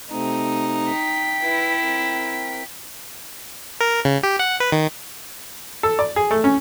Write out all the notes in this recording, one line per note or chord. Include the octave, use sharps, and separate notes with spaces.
C3 A3 C4 D#4
G5 B6
E4 B4 E5
C4 A#4
A#4
C#3
G4
F#5
B4
D#3
A4
D5
G#4
A3
C#4